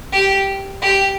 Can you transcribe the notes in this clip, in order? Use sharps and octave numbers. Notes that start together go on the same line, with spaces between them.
G4
G4